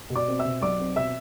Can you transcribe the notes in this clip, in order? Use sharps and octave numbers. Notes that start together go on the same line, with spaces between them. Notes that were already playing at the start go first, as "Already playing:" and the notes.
B2
D5 D6
C4
E5 E6
B2
B1 D5 D6
C4
B2 E5 E6